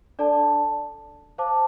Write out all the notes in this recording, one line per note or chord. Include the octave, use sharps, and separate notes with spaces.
D4 A4 D5 A5
C5 F5 A5 D6